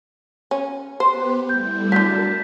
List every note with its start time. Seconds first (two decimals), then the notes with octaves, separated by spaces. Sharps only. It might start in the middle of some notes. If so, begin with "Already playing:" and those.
0.51 C#4
1.00 B3 G4 B4 C5
1.49 G3 A3 E4 G6
1.92 D3 F#3 A#4 A5 G6 B6